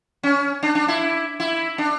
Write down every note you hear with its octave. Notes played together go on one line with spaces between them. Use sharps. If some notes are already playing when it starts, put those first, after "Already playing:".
C#4
D4
D4
E4
E4
D4